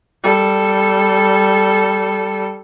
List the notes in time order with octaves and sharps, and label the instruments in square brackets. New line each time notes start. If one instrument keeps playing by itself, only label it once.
[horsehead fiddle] G3 A4